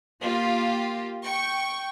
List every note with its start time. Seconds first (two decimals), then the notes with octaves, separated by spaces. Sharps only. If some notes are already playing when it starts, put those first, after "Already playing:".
0.21 A#3 F4 G4
1.23 G5 C#6